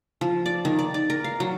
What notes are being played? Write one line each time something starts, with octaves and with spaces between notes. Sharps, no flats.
F3
D5
D#3
D5
D5
A#4
F5
F#3